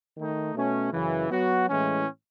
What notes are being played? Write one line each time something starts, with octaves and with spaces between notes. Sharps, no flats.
D#3 A3 D#4
B2 A3 C#4
F#2 C#3 E3
F#3 B3 F#4
A2 E3 G#3 C#4